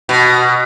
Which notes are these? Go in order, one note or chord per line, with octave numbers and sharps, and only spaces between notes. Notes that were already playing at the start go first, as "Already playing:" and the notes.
B2